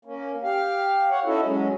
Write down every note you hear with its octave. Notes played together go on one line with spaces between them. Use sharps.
A#3 C#4
G4 F5
C#5 F#5
C#4 D#4 E4 F#4 A4
F#3 G#3 C#4